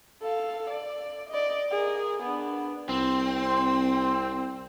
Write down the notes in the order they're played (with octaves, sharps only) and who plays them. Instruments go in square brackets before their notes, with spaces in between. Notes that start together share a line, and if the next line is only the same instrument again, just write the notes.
[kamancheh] A4 F5
D5
D5 D#5
G#4 A#4
B3 D4
[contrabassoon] C2 [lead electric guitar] C4 [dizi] C6